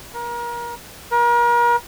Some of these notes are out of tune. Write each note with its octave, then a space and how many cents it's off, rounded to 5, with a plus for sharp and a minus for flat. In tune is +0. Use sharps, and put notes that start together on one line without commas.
A#4 +30
A#4 +40